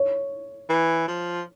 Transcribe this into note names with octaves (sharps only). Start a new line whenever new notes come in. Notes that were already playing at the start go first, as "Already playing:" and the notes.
Already playing: C#5
E3
F3